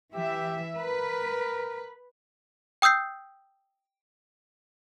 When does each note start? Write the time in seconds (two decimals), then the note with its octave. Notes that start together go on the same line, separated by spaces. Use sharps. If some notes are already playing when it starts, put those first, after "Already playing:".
0.14 E3 G4 E5
0.76 A#4 B4
2.82 G5 D#6 E6 G6 C7